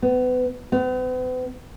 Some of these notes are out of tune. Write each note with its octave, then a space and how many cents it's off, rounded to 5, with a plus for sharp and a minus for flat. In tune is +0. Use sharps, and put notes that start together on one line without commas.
B3 +30
B3 +45